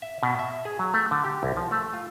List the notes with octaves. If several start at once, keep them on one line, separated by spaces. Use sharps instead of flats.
E5
B2
E5
G#4
F#3
A3
D3
G4
C2
F3
A3
F4